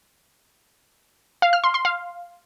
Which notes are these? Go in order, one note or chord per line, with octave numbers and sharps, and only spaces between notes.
F5
F6
C6
C6
F5